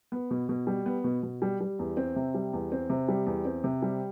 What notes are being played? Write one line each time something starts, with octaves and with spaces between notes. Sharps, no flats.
B3
B2
B2
G3
B3
B2
B2
G3
G3
E2
C4
C3
G3
E2
C4
C3
G3
E2
C4
C3
G3